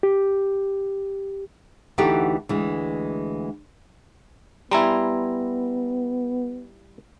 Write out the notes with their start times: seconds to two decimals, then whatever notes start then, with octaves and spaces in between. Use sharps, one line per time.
0.03 G4
1.98 D2 E3 D#4 F#4 G4 A4
2.49 D2 E3 G#3
4.71 G3 B3 E4 G#5 A#5 C6